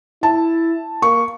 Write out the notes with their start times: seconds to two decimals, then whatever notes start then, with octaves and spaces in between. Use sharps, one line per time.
0.23 E4 A5
1.02 A#3 C#6